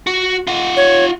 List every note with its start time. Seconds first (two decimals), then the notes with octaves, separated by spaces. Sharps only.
0.07 F#4
0.47 F4 F#5
0.77 C#5